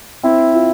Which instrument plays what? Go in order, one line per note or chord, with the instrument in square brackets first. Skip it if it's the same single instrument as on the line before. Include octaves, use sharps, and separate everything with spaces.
[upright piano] C4 [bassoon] E4
[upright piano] F4